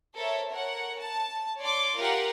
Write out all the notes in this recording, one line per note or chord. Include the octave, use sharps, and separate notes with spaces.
A4 A#4 C5 C#5 E5
A#4 C#5 F#5
A5
C#5 D5 C6 D6
F4 G4 A#4 F5 F#5